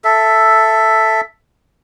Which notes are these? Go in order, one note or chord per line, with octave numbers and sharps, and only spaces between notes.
A4 E5